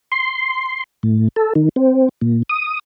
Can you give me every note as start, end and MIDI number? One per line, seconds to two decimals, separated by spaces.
0.12 0.83 84
1.03 1.28 45
1.36 1.53 69
1.55 1.69 51
1.76 2.09 60
2.22 2.42 46
2.49 2.79 87